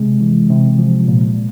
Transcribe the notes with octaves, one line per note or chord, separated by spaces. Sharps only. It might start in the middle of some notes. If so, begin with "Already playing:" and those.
Already playing: C3 G#3
E3
C3
F3
A#2